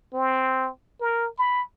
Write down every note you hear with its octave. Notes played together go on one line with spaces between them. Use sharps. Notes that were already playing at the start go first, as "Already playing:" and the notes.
C4
A#4
B5